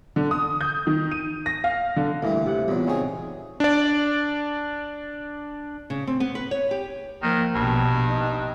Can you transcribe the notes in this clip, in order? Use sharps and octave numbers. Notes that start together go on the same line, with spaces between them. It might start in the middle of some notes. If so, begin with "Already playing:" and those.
D3
D#6
G6
D#3
D#7
A#6
F5
D3
D2 G2 E3 G3 A#3
C3 F#5
E2 A#2 F#3
C#3 B3 C4 D#4 G#4 C#5
D4 D5
C#3
C4
B3
B4
C#5
G4
D#3 F3 A#3
A#1 G2 B2
D#4